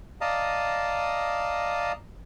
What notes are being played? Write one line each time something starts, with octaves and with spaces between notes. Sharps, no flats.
D5 D#5 F5 A5 A#5 D#6